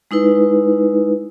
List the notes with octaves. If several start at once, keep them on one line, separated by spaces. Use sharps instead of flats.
G#3 D#4 E4 B4